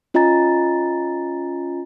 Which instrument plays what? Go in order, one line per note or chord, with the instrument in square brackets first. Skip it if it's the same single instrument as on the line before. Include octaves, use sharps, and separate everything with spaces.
[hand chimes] C#4 F4 D#5 G#5 A#5 A6